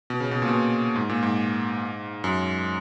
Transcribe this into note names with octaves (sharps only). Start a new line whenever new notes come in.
B2
C#3
B2
A#2
B2
A#2
G#2
A#2
G#2
F#2